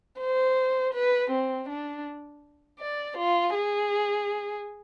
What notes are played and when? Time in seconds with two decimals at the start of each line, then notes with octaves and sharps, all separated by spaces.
0.20 C5
0.94 B4
1.31 C4
1.69 D4
2.79 D5
3.17 F4
3.54 G#4